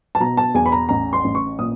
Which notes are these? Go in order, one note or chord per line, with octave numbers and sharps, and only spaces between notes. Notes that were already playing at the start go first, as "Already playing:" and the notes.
A5
B2 A#5
A5
E2 G#5
B5
A#5
A1 A#5
C6
A1
C#6
A#2 D#6